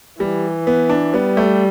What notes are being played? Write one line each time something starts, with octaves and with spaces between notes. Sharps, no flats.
E3 G3
B3
D4
G3 B3
A3